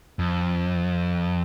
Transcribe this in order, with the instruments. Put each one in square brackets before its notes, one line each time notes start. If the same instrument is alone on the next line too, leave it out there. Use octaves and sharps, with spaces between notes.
[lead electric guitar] F2